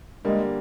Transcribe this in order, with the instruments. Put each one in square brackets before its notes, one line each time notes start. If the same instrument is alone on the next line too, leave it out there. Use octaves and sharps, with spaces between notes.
[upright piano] D3 G3 A#3 [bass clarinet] G#3